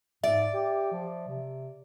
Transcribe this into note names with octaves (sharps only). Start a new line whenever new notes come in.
G#2 D5 E5
G4
F3
C3